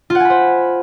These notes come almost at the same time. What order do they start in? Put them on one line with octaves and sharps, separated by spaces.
F4 F#5 G#5 B5 C5